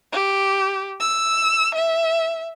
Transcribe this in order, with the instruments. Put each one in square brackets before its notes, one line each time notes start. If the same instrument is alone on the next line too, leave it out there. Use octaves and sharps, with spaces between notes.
[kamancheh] G4
E6
E5